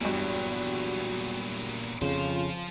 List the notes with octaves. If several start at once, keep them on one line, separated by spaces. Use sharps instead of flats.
E2 G2 A#2 F#3 F#4
F2 C#3 F3 F4 C5